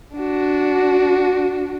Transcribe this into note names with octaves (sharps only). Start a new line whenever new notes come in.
D4 F#4